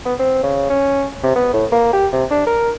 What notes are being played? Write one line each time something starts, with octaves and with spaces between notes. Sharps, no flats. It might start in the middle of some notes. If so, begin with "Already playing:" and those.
B3
C4
C#3
C#4
C3
B3
A2
A#3
G4
C3
D4
A#4